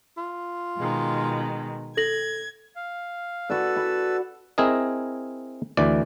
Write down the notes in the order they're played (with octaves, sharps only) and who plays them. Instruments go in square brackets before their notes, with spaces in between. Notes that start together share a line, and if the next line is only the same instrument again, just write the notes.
[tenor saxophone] F4
[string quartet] B2 D#3 G#3
[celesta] A4 A#6 F#7 [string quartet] G#6
[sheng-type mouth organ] F5
[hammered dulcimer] F#4 D5 [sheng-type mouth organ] A4 B4 E6
[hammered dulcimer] B5
[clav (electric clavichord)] C4 E4 G#4 A#4 D#5
D2 E3 D5